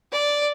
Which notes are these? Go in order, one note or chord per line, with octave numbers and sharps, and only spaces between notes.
D5